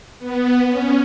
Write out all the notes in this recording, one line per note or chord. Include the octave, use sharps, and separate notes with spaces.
B3
C#4